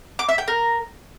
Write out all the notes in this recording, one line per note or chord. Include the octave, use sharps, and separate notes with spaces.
D6
E5
G5
A#4